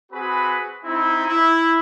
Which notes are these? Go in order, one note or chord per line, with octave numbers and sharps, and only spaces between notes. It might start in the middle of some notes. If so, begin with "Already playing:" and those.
C4 F#4 G#4 B4 B5
C4 D#4 E4
E4